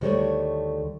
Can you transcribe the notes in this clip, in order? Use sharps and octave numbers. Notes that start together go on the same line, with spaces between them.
D2 D#3 G3 A3 C#5